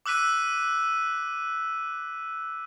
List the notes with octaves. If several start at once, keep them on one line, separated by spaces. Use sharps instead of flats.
D6 E6 F#6 B6 D#7